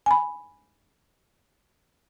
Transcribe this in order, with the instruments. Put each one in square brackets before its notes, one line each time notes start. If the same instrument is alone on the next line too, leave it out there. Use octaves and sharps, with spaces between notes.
[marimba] G#5 B5